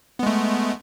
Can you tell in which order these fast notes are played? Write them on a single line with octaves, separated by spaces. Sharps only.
B3 G#3 A3